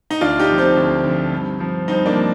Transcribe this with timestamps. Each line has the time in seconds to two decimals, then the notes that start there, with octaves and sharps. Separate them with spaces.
0.10 D#4
0.21 D2 D4 F4
0.39 D#4 G4
0.50 D3 F3
0.58 C4 D#4
0.77 D2
1.04 D3 F3
1.33 G2
1.60 F3
1.88 G2 C4 D#4
2.06 A#3 D4
2.15 F3